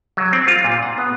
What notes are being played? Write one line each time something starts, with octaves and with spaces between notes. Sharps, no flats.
F#3
C4
F4
A#2
F#5
B3